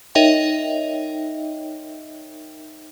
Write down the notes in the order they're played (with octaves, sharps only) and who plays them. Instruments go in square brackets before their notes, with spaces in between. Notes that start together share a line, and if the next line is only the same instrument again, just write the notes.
[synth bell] D#4 A#4 C#5 D#5 E5 G5